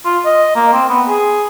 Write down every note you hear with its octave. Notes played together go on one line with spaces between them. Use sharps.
F4
D#5
A#3
C4
B3
G#4